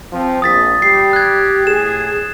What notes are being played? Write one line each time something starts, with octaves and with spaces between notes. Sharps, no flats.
F3 C4 C5
A#1 D#6 A6 B6
G3 G4 C7
F#6 G#6
A2 G#4 E7